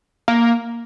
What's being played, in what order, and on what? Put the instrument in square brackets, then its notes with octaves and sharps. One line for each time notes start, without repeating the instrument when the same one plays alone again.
[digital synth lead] A#3